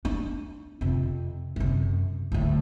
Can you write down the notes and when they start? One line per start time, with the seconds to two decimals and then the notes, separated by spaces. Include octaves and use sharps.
0.05 D4
0.81 F2 C3
1.56 F#2 C3
2.32 D2 A2